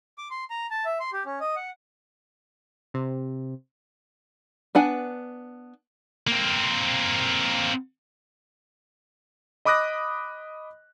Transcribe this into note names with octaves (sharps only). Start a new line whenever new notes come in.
D6
C6
A#5
A5
E5
C6
G4
C#4
D#5
F#5
C3
B3 D4 F#5 G#5
A#3 C4
D#5 B5 D6 D#6 F#6 A#6